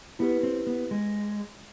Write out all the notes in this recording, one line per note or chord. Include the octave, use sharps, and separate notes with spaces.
B3 E4 G4 B4
C4
B3
G#3